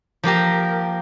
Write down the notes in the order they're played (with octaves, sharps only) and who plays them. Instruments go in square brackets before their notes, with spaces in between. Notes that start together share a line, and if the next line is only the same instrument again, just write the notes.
[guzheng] F3 A#3 G4 A#4